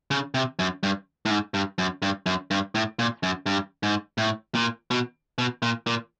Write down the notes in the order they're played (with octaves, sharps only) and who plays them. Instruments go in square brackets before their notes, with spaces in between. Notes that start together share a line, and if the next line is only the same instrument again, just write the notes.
[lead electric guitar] C#3
C3
F#2
G2
A2
G#2
G2
F#2
G2
F#2
G2
A2
A#2
F#2
G2
G#2
A2
A#2
B2
B2
A#2
A#2